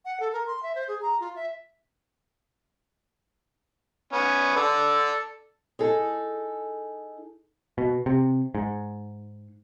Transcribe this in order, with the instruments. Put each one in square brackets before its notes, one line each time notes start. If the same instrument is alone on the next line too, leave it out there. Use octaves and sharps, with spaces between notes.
[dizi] F#5
A4
A#4
C6
E5
C5
G#4
A#5
F4
E5
[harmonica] B3 C#4
A4 D5
[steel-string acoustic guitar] D#4 G#4 A4
[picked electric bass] B2
C3
G#2